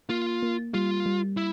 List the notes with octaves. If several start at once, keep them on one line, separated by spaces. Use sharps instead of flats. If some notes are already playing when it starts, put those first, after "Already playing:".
A#3 F4
A#3
G3 F4
G3
E4